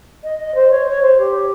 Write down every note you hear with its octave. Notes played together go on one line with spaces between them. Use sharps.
D#5
D#5
C5
C#5
C#5
C5
G4